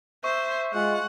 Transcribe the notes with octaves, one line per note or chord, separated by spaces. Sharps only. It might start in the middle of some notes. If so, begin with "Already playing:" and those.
C5 E5 C#6
G#3 F4 F#5